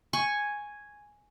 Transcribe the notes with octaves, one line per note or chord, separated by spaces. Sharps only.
G#5 C#6